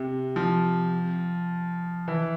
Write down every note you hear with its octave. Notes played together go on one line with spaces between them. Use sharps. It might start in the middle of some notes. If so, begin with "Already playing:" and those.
Already playing: C3
F3
E3